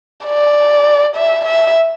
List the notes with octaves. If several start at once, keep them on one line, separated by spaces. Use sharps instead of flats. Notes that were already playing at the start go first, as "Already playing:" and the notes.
D5
E5
E5